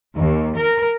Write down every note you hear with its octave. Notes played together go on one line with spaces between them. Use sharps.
D#2
A#4